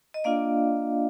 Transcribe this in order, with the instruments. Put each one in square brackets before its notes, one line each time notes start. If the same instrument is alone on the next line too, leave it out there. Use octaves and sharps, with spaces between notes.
[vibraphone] D#5
A#3 D4 F4 D5 F5